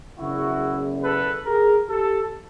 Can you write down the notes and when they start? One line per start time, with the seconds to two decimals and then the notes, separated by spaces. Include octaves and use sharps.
0.18 F#1 E2 C#3 E4 F#4
1.03 A4 B4
1.45 G#4 A#4
1.89 G4 A4